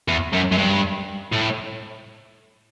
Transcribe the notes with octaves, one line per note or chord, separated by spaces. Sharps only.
E2
F#2
F#2
G2
A2